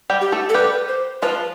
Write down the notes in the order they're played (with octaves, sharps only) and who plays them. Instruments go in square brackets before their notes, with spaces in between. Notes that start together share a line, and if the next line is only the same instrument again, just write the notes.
[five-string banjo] G3 G4
[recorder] G4
[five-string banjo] A3 A4
[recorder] A4
[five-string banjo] G3 G4 [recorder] B4
[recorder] C5
[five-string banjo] F3 F4 [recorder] B4